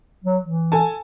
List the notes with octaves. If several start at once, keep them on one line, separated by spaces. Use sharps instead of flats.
F#3
E3
A4 G#5 A5